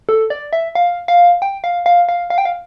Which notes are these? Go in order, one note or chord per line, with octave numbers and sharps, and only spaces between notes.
A4
D5
E5
F5
F5
G5
F5
F5
F5
F5
G5
F5